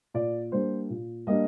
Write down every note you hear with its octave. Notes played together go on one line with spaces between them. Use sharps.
A#2 D5
G3 A#3 D4 C5
A#2
G3 A#3 D4 D#5